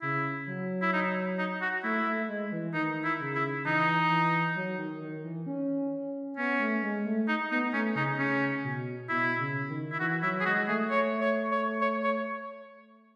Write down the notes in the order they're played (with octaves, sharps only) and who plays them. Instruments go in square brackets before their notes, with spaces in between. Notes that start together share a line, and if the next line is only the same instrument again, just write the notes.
[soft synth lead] C#3 [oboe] E4
[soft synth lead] F#3
[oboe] E4
D#4
D#4
F#4
[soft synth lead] A3 [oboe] E4
[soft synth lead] A3
G#3
E3
[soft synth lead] D#3 [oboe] D#4
[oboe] E4
[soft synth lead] C#3
[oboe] E4
[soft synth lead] E3 [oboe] D#4
[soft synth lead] E3
F#3
D#3
D#3
E3
C#4
[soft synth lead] B3 [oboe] C#4
[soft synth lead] A3
G#3
A3
[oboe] D#4
[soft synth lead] B3 [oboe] D#4
[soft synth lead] A3 [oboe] C#4
[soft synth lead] C#3 [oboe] D#4
[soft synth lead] C#3 [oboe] C#4
[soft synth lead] B2
[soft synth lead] B2 [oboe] E4
[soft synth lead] C#3
D#3
[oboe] E4
[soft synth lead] E3 [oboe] F#4
[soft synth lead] F#3 [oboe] E4
[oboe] G#4
[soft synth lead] G#3 [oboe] F#4
[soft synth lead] A3 [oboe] G#4
[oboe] C#5
C#5
C#5
C#5
C#5